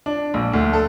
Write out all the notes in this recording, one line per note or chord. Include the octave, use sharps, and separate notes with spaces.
D4
A#1
D2
A4